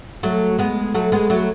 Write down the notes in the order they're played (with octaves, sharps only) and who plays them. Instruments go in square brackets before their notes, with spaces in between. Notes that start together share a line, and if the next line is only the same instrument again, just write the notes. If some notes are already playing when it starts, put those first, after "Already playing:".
[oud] F#3 A3
G#3 B3
F#3 A3
G#3 B3
F#3 A3